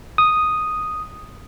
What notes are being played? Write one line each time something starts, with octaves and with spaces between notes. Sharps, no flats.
D#6